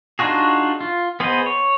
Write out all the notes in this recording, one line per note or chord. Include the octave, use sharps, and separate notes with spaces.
D4 D#4 F4 F#4 G#4
F4
B3 G#4 C5 D#5
C#5